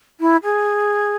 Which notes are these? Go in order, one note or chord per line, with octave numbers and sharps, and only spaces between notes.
E4
G#4